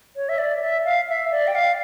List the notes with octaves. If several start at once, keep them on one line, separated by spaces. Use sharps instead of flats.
C#5
E5
D5
E5
F5
E5
D5
G5
F5